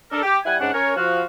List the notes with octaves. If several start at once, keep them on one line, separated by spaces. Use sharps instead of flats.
D4 A4 A#4
G4
G3 E4 F#5 G#5
G#2 C#4 D4 F#5
C#4 A#4 C#5
F3 F#4 F5